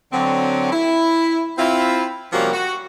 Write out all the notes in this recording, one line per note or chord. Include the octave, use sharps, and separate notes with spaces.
D3 F#3 C4
E4
C4 E4 F4
C3 F3 G3 A#3 C#4 F#4
F#4